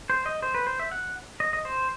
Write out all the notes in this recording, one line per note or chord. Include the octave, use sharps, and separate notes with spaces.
C5
D#5
C5
B4
C5
E5
F#5
D#5
D#5
C5